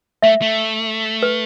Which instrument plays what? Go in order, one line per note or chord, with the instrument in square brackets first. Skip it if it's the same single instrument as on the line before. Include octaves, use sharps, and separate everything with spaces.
[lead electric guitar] A3 [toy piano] E5
[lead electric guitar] A3
[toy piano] B4